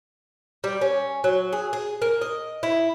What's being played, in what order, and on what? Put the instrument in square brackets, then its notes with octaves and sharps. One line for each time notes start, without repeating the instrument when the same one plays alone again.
[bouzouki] G3
C#4
F#3
G#4
G#4
A#3
D#5
E4